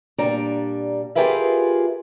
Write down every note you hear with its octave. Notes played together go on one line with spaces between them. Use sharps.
A#2 G3 D4 D5 A#5
F4 G4 G#4 A#4 B4 E5